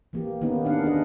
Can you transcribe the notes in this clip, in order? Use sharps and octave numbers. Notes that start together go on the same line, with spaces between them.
E3 A#3 G4
D#3 A#3 B3 C#4 D#4
D4 F5 F#5
D4 G#4 D#5